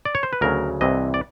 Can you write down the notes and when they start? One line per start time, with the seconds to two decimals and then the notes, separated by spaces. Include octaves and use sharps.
0.05 D5
0.15 C#5
0.23 C5
0.33 B4
0.41 D2 C#3 F#3 A#4
0.81 C2 C3 E3 D#5
1.14 D5